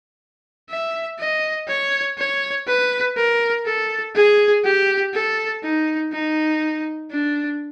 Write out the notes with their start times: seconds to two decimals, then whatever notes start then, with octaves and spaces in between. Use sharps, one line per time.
0.70 E5
1.19 D#5
1.68 C#5
2.18 C#5
2.67 B4
3.17 A#4
3.66 A4
4.15 G#4
4.64 G4
5.14 A4
5.63 D#4
6.13 D#4
7.11 D4